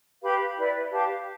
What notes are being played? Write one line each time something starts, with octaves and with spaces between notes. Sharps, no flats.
G4 B4 F5 B5
E4 B4 D5
G4 B4 F5 A5